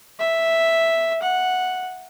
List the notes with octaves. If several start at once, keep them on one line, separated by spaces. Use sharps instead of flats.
E5
F#5